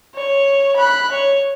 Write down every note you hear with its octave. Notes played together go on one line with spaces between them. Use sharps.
C#5
B5 F#6
C#5